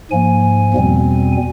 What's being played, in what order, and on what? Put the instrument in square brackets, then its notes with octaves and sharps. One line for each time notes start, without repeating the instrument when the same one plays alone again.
[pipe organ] G#2 F3 A#3 G#5
E2 B2 G3 C4